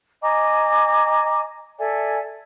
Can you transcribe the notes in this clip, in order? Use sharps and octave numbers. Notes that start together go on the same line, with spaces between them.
D#5 G#5 A#5 D6
A4 D5 E5 G#5